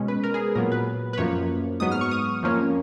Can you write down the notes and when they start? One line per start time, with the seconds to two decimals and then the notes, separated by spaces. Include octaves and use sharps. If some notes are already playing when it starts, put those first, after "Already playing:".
Already playing: B2 G#3 C#4
0.08 B4
0.24 A#4
0.34 G#4
0.55 A#2 F#3 B3 A#4
0.72 B4
1.13 B4
1.18 F#2 F3 A#3 C#5
1.80 G#2 F#3 B3 D#6
1.92 F6
2.01 C#6
2.11 D#6
2.43 F2 F3 A#3 C#4